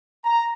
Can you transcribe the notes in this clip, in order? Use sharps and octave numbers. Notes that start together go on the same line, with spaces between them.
A#5